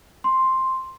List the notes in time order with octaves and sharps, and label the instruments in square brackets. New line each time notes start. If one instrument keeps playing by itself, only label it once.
[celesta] C6